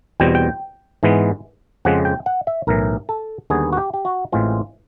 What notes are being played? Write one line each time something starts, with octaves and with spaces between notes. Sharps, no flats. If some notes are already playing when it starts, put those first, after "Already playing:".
E2 B2 G3 C4 G5
G5
G#2 E3 G#3 B3
F2 C#3 F3 G#3 C4 F#5
G5
F#5
E5
B1 A2 E3 A#4
A4
D#2 D3 G3 B3 G#4
F#4
G4
G4
F#4
A1 A2 E3 G#3 C4 F4